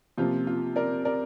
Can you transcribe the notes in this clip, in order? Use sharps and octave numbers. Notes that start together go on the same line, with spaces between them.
C3 F3 A#3 F4
F4
A#4 D5
A#4 D5